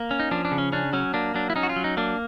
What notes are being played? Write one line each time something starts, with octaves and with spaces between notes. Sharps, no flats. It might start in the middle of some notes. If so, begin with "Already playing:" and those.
Already playing: A#3
C#4
D#4
F3 D4
D4
C#3
C#4
C#4 D4
F#3 C#4
A#3 D4
F#3 D4
E4
C#4 D#4
F#4
F4
F#3
D#4
A#3 D4